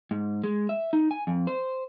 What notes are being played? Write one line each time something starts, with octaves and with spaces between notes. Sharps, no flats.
G#2
G#3
E5
D#4
G#5
F2
C5